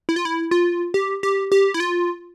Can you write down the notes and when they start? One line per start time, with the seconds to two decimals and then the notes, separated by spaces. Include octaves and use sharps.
0.09 E4
0.16 F4
0.25 E4
0.51 F4
0.94 G4
1.23 G4
1.52 G4
1.74 E4
1.80 F4